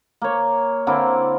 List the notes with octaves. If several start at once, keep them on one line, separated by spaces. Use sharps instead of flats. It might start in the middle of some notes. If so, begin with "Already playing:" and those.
A#3 C#5
D3 A#3 C4 E4